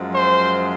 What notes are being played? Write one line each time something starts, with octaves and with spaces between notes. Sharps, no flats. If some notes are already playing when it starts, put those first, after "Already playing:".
Already playing: F#2 F3 G#3
C5